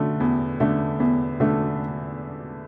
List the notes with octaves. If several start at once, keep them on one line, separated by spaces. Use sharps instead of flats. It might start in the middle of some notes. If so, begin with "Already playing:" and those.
Already playing: D3 A3
E2
D3 A3
E2
D3 A3